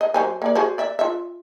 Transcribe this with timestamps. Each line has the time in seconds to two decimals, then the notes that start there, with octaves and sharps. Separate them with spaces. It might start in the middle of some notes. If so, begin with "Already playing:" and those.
0.01 D#5
0.14 F#3 C5 G#5
0.42 A#3 D5
0.55 F#4 G#4 C5
0.78 D5 E5
0.99 F4 E5